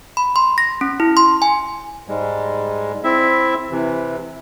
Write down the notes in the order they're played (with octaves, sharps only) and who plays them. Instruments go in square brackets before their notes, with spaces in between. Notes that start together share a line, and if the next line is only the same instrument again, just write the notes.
[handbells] B5
C6
A#6
C#4
E4
C6
G#5
[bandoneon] G#2 G3 G#3
C4 E4 E5
C3 E3